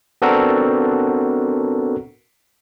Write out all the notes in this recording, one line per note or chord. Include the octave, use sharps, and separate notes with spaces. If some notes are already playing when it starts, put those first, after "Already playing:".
B3 C4 D4 F#4 A4 A#4